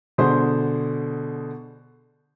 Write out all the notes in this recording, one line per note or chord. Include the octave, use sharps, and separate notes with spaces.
B2 D3 G#4 C5 C6